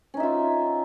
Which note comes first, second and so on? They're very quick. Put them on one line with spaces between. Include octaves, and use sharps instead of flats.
C#4 D#4 E5 F4